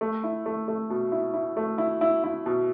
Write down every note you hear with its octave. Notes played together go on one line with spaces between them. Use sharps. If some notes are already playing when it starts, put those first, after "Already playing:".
A3
E4
A3
A3
B2
E4
E4
A3
E4
E4
E4
B2